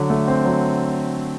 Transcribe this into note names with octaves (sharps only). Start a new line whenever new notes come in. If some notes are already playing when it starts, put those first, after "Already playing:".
Already playing: D3 F#3
A3
C4
F#3